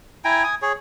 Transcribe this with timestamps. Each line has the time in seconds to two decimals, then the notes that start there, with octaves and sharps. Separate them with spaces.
0.25 E4 G5 G#5 A#5
0.44 G#5 D#6
0.62 G#4 C#5